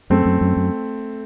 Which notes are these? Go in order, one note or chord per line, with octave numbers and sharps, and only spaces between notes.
F#2 A3 C4
F#2
F#2
F#2